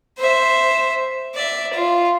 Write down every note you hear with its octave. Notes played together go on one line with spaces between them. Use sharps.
C5 E5
D5 E5
F4